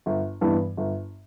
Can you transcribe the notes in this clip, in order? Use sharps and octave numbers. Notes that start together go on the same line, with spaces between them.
G1
G2 E3 B3
G1